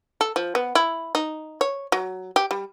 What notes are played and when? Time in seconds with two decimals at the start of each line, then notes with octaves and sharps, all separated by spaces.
0.21 A4
0.36 F3
0.55 B3
0.75 E4
1.15 D#4
1.61 C#5
1.92 F#3
2.36 G4
2.51 G3